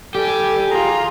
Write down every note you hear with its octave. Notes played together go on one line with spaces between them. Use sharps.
G3 G4 A4 G#5
F4 G#4 A#5